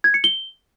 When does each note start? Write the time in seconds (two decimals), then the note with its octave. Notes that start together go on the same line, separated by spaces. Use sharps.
0.04 G#6
0.14 C#7
0.24 G7